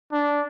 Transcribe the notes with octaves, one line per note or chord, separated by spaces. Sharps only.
D4